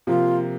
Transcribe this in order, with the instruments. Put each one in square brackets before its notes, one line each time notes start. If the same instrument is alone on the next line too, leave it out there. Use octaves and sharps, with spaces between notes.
[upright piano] C3 F3 A#3 [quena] F4